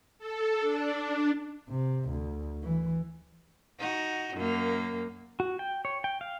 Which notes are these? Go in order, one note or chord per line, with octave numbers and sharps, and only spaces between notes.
A4
D4
C3
D2
E3
D#4 F#4
F#2 A#3
F#4
G5
C#5
G5
F5